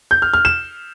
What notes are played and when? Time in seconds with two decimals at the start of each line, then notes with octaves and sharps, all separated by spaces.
0.11 G6
0.22 F6
0.34 F6
0.45 E7